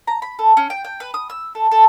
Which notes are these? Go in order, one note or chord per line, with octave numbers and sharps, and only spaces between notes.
A#5
B5
A4
C#4
G5
G5
B4
D#6
E6
A4
A4